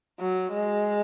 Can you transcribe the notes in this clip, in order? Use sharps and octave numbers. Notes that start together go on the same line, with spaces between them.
F#3
G#3